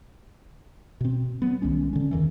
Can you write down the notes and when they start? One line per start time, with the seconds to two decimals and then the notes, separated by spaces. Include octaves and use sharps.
1.01 B2 C4
1.42 F#3 B3
1.62 C2 D#3 G#3 C#4
1.93 D3 C#4
2.11 E2 D#3 E3